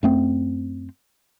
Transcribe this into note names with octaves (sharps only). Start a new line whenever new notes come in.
F#2 A3 C4